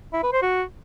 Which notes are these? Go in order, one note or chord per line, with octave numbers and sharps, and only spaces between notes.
E4
B4
C5
F#4